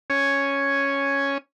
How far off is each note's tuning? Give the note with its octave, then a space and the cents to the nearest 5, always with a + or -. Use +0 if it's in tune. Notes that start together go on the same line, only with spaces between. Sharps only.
C#4 +0 C#5 +0 G#5 +5